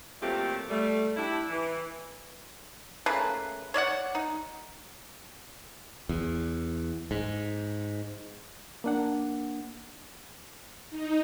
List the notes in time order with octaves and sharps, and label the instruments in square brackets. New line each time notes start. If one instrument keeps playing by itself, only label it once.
[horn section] A#2 F#3 A3 C4 F4 G4
G3 A3
D4 E4 G4
E3
[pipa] C#3 A3 A#3 B4
C#5 D5 E5 F#5
D#4
[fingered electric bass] E2
G#2
[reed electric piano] A#3 D4 F#5
[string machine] D#4